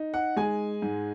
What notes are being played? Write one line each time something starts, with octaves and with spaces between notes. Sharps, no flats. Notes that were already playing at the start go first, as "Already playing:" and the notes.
Already playing: D#4
F#5
G#3 G#5
G#2